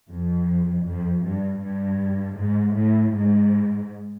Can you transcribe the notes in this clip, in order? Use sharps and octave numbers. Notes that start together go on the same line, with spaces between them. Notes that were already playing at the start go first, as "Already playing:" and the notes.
F2
F2
G2
G2
G#2
A2
G#2